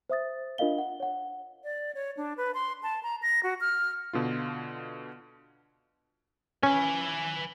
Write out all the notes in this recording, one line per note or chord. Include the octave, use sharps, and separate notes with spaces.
C5 E5 D#6 A6
D4 F4 A#4 D#5 F5 G7
F#5
C#5 F#5
D5
C#5
D4
B4
C6
A5
A#5
A#6
F#4
F6
B2 D3 F4
C#4 B4 G#5